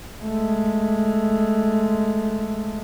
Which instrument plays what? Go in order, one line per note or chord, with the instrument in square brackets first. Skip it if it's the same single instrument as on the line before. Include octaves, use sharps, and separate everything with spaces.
[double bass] G#3 A3